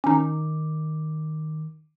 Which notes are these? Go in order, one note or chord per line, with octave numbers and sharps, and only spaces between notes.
D#3 C#4 D#4 D6